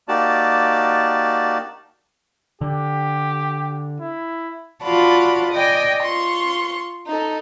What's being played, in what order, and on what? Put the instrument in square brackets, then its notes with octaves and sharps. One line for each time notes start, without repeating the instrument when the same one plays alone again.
[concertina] A#3 D#4 F#4 G4 D5 A5
[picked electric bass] D3 [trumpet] G4
[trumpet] E4
[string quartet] F4 F#4 D5 A5 B5
D5 D#5 G5 G#5
F4 C6 C#6
D#4 A4